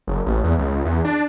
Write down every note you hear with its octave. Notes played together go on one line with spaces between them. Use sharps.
F#1
A1
E2
C#2
E2
D4